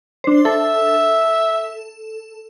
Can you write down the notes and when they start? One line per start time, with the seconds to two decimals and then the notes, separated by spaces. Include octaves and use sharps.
0.24 D4 C5
0.45 A4 E5